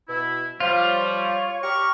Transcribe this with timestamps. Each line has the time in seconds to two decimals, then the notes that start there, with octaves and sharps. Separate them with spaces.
0.09 B2 E4
0.60 F3 G3 F4 C#5
1.63 G4 A#4 C#6